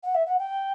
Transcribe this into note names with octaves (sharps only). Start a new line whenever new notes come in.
F#5
E5
F#5
G5